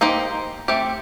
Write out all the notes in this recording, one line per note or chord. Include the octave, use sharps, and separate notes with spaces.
A#3 D#4 G4 C5
A3 C4 G4